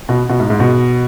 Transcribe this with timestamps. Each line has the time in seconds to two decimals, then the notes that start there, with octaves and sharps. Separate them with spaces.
0.09 B2
0.29 B2
0.40 G#2
0.50 G#2
0.60 B2